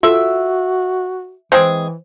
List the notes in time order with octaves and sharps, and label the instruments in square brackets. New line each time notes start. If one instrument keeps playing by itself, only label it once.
[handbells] F4 A4 [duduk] F#4 [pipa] E5
[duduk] E3 [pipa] G#3 C4 G#4 [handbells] C5